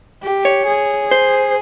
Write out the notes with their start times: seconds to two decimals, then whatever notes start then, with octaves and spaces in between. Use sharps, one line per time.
0.23 G4
0.45 C#5
0.66 G#4
1.11 C5